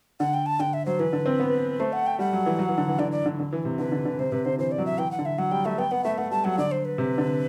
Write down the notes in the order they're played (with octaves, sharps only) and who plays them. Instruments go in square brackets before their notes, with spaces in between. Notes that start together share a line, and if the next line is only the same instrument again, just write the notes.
[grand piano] D3 [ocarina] F#5
[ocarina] G5
A5
[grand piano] D3 [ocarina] G5
[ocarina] E5
[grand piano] F#3 [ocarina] C5
[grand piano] E3 [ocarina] B4
[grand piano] D3
C4
B3
[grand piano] A3 [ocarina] C5
[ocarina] F#5
G5
[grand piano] G3 [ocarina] F#5
[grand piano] F#3
E3
F#3
E3
D3
E3
[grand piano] D3 [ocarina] D5
[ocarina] D5
[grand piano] D3
D3
E3
C3
[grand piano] D3 [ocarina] B4
[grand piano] D3
D3
[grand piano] C3 [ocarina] C5
[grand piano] C3 [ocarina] B4
[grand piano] D3 [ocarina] C5
[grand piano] E3 [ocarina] C5
[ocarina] D5
[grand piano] F#3
[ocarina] E5
[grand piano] E3 [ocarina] G5
[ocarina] F#5
[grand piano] D3
[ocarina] E5
[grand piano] F#3 [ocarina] F#5
[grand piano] G3 [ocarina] G5
[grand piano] A3 [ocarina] E5
[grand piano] B3 [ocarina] G5
[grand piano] B3 [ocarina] F#5
[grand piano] A3 [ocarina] E5
[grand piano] A3 [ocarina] F#5
[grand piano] G3 [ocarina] A5
[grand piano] F#3 [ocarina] F#5
[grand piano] D3 [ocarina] D5
[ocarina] C5
B4
[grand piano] C3
D3